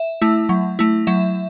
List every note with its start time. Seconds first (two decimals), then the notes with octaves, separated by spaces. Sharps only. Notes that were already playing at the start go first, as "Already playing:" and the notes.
Already playing: E5
0.22 A3 E4
0.49 F#3
0.79 A3 E4
1.07 F#3 E5